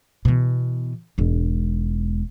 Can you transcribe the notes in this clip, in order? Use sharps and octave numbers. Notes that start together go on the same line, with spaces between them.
B2 E3
E1 G#2